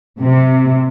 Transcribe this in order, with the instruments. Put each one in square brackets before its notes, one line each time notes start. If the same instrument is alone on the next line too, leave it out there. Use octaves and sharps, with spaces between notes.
[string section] C3